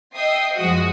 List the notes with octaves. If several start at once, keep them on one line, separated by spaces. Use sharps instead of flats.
D#5 E5 G5 D#6 C7
F#2 F3 G#3 F#4 D#6